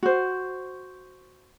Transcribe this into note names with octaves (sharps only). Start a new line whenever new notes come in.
F#4 C5